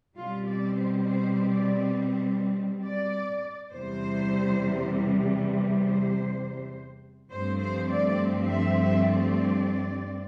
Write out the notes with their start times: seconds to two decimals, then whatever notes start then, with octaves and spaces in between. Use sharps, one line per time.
0.16 B2 G3 C4 F4
0.47 D5
0.76 C5
1.06 C5
1.50 D5
2.84 D5
3.73 E2 C3 G3 C5
5.52 C5
7.30 G2 F3 A3 C4 C5
7.60 C5
7.90 D5
8.49 E5
8.79 E5
9.09 D5